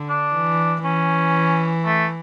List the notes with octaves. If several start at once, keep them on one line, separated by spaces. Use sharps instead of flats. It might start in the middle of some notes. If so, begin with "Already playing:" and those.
Already playing: D3
D4
E3
E3 C#4
A3